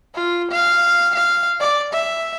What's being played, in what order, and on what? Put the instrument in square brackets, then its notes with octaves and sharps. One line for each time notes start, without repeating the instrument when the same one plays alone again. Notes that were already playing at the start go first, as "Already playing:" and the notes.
[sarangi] F4
F5
F5
D5
E5